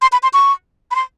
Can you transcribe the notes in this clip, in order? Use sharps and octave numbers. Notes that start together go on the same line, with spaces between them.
C6
B5
C6
C#6
B5
C6